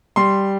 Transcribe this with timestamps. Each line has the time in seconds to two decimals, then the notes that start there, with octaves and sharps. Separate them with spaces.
0.16 G3 C6